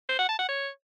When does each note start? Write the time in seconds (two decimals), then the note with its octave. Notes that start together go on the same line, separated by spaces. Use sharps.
0.09 C5
0.19 F#5
0.29 A5
0.39 F#5
0.49 C#5